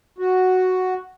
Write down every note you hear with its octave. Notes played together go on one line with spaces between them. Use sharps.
F#4